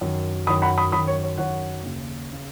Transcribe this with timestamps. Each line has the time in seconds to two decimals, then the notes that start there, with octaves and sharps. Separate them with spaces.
0.01 F#2 D#3
0.47 F#2 D#3 B5 D#6
0.62 F#5 B5
0.78 B5 D#6
0.92 F#2 B5 D#6
0.96 D#3
1.07 C#5
1.23 C#5
1.38 F#2 D#3 C#5 F#5
1.84 D#2 C#3
2.33 C#3